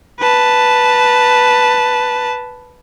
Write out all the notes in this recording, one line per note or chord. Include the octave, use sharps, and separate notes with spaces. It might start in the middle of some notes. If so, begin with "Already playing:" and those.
B4 A5